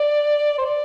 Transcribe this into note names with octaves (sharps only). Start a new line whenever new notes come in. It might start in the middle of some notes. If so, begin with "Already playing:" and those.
Already playing: D5
C5
D5